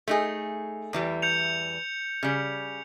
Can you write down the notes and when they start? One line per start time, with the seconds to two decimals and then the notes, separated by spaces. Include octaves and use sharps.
0.08 A3 D#4 G#4
0.93 E2 E3 G3
1.22 G6 C#7 F7
2.23 C#3 G3